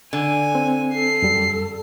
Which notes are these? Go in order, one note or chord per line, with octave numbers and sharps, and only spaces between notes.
D3 G#5
C4
A4 C7
F#2 G3